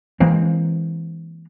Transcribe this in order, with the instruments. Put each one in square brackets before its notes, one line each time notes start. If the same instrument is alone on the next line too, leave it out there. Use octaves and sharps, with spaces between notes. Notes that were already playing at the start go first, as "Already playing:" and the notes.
[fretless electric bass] E3 G#3 A#3 C4